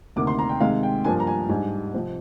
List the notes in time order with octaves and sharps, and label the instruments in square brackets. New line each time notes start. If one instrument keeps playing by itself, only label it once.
[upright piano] D2 C3 D#3 A#3 D6
C6
A#5
G5
C3 D#3 G#3 F5
G5
G2 F3 A#3 D4 G#5
A#5
G#5
G#2 G3 D4 G#5
C3 F3 C4